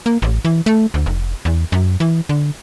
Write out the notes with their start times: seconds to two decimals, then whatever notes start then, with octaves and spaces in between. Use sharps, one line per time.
0.06 A#3
0.22 A1
0.45 E3
0.66 A3
0.94 D2
1.06 F1
1.45 E2
1.72 F#2
2.00 E3
2.29 D3